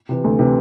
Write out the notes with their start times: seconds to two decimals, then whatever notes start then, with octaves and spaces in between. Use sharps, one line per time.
0.09 C3 E3
0.24 D2
0.39 C3 E3